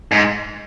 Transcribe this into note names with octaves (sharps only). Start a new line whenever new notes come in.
G#2